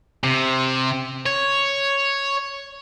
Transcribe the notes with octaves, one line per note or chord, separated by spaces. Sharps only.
C3
C#5